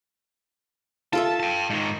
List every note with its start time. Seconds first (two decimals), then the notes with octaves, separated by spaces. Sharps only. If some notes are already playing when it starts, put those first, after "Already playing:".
1.13 F4 A4 E5 A5
1.40 G5 A5
1.70 G#2 D#3